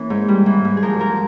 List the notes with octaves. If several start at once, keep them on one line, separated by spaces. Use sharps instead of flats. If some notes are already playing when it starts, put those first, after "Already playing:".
Already playing: E3 A#3 C#4
G#2
G3
E3
G#2
G#4
F3 A#4
F3 A#4